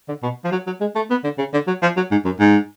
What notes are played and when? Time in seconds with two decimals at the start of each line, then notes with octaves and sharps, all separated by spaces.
0.08 D3
0.23 B2
0.44 F3
0.52 F#3
0.67 F#3
0.81 G#3
0.96 A3
1.11 B3
1.24 D3
1.38 C#3
1.53 D3
1.67 F#3
1.83 F3
1.97 F#3
2.11 G#2
2.25 F#2
2.39 G#2